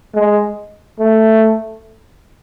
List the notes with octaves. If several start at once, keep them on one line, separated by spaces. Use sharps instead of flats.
G#3
A3